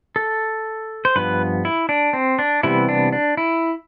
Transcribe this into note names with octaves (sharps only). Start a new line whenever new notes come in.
A4
C5
G2 F3 B3 B4
E4
D4
C4
D4
C3 E3 G3 B3 E4
D4
D4
E4